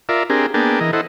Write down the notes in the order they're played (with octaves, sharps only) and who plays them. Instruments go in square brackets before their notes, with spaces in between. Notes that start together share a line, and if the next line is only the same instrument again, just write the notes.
[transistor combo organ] F4 A#4 D5 E5
C4 D4 G4 G#4 A#4
A#3 B3 D4 G#4 G5 A5
E3 A#4 D#5
E4 A4 C5 D#5 F#5